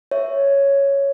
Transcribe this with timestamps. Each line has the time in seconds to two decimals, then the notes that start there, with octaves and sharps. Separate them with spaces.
0.11 C#5 E5